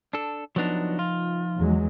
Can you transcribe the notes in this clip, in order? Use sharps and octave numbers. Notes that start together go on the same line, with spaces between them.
D4 A4
F3 F#3 B3 D4 D#4
F4
E2 F#3 G#3